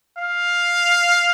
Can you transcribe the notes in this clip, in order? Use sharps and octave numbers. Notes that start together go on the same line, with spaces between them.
F5